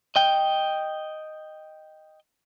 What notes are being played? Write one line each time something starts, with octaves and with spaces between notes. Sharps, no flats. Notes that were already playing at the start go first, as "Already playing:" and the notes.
D#5 G5